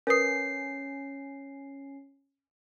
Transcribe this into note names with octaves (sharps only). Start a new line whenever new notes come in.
C#4 A#4 B4 D#6 C7